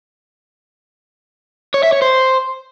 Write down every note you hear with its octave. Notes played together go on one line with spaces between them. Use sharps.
C#5
E5
C#5
C5